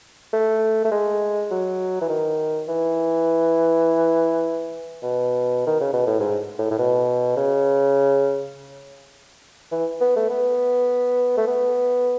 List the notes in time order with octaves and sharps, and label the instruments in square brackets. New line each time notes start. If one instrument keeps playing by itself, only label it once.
[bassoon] A3
A3
G#3
F#3
E3
D#3
E3
B2
D#3
C#3
B2
A2
G#2
A2
A2
B2
C#3
E3
B3
A3
B3
A3
B3